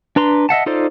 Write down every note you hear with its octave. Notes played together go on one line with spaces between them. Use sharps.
D4 B4 A#5 C6
D#5 E5 F#5 A5
D#4 F4 A4 C5 D5